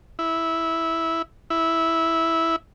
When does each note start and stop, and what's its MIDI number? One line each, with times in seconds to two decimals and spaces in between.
0.19 1.22 64
1.50 2.56 64